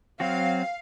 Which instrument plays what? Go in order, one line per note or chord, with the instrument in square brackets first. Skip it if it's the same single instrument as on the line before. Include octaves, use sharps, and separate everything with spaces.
[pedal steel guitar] F#3 C4 F#4 [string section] F5